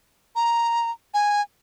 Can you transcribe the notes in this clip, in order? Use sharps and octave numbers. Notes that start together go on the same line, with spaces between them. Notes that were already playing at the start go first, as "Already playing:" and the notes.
A#5
G#5